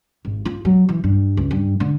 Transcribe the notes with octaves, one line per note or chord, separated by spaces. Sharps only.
G#1
F4
F#3
E3
G2
C#2
G2
D3